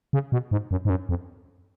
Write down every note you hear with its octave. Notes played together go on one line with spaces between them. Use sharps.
C#3
B2
G#2
F#2
G#2
F#2
F2